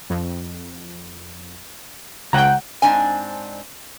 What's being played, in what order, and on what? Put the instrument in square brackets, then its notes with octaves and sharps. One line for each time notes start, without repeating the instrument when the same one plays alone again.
[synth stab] F2
[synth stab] C#2 G5 [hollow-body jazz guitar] F#5 A#5
[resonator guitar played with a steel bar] G#2 C4 D4 G#5